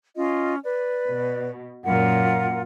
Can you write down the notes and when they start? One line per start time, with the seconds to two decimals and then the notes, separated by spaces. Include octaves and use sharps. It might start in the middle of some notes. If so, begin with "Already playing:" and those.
0.16 C#4 F4 D#5
0.65 B4 D5
1.09 B2
1.84 F#2 A#2 F4 A#4 F#5